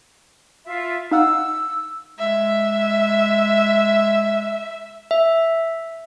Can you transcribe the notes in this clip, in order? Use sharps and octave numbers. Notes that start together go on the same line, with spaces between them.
F4 E5
D#4 F5 F#5 E6
G#3 E5
E5